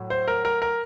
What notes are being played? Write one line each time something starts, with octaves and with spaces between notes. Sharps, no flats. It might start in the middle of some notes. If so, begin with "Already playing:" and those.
Already playing: A2 F#3
C5
A#4
A#4
A#4